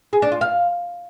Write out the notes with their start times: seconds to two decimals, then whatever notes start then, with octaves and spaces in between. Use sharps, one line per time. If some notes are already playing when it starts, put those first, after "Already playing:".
0.13 G#4
0.22 D4
0.32 F4
0.41 F5